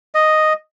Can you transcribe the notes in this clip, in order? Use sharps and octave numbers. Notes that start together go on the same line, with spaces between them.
D#5